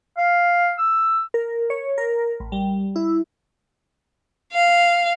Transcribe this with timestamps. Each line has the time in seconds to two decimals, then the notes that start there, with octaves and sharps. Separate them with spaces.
0.18 F5
0.79 E6
1.34 A#4
1.70 C#5
1.98 A#4
2.40 A1
2.52 G3
2.96 E4
4.53 F5